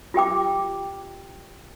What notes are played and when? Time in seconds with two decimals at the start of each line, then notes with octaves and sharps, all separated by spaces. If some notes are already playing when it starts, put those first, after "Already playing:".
0.14 F4 G4 G5 D6